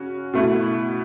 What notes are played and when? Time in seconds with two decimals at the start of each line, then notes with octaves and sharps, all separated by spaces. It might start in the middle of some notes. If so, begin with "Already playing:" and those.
Already playing: C#3 C#4 F#4
0.33 B2 A3 E4